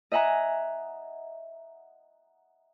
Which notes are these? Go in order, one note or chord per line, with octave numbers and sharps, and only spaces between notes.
D#5 E5 F#5 G#5 A#5